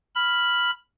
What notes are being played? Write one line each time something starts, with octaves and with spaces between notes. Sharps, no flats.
B5 F6